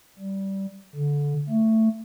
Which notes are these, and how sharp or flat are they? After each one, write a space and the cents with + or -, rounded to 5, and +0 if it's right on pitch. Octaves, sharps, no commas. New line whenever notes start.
G3 -15
D3 -20
A3 +15